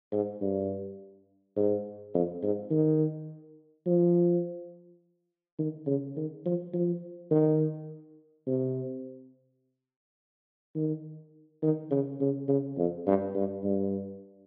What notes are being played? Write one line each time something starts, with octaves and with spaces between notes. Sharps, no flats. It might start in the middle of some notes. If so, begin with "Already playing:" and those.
G#2
G2
G#2
F2
G#2
D#3
F3
D#3
C#3
D#3
F3
F3
D#3
C3
D#3
D#3
C#3
C#3
C#3
F2
G2
G2
G2